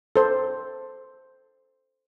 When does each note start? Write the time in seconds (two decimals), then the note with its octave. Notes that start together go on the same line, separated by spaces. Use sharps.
0.16 A4 C5